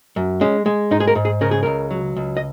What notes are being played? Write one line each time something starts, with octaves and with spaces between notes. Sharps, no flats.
F#2
G#3 C#4
G#3
G#2 D#4
G#4
A#4
G#2
G#4
C#3 A#4
G#4
C#2 A#4
F#3
C#2
D#5